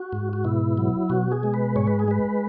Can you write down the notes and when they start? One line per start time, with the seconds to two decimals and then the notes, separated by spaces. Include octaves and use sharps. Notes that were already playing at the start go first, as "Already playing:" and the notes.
Already playing: F#4
0.13 G#2
0.33 F#4
0.44 B2 E4
0.78 F#3
1.10 B2 F#4
1.32 G#4
1.43 G#3
1.54 B4
1.76 G#2 C#5
1.87 B4
2.00 G#4
2.08 G#3 B4